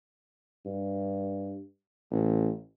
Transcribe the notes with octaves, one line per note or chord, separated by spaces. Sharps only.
G2
A1